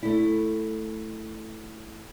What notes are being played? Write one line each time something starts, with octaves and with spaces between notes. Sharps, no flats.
A3 E4